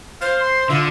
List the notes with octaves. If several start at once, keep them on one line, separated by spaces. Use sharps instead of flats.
C5 F5
C6
D3 F4 E5